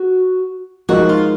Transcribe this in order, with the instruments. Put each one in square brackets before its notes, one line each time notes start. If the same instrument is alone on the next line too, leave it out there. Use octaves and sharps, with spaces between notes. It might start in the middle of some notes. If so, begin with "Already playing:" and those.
Already playing: [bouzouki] F#4
[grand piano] F3 G#3 D#4 A#4 D#5 [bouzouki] F#4
[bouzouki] F4